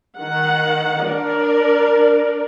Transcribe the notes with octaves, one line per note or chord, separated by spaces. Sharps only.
D#3 F#5
D4 A#4 D5